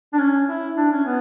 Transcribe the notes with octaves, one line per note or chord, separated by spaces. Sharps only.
D4
C#4
E4
D4
C#4
B3